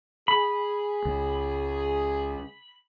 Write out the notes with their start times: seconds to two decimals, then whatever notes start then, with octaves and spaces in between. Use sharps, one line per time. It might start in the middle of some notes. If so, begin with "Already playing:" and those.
0.28 G#4 B5
1.05 C#2